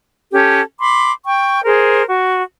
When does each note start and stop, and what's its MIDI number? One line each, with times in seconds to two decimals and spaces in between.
0.32 0.61 61
0.32 0.61 67
0.32 0.61 69
0.79 1.11 83
0.79 1.11 84
0.79 1.11 86
1.27 1.64 79
1.27 1.64 85
1.65 2.03 68
1.65 2.03 70
1.65 2.03 72
2.08 2.42 66